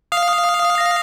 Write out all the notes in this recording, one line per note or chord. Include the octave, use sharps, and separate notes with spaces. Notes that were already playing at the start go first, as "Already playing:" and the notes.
F5 D#6
D#6
D#6
D#6
A#6